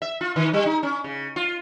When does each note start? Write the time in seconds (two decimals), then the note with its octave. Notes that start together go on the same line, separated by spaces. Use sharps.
0.02 E5
0.21 F4
0.36 D#3
0.54 G3
0.66 D#4
0.83 C#4
1.04 C#3
1.36 F4